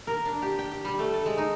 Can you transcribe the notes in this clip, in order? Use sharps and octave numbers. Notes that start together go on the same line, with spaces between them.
A#4
D4
G4
G5
G4
G3
A3
A4
G#3
D#4